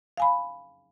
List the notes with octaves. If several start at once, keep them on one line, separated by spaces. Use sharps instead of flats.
F5 G#5 B5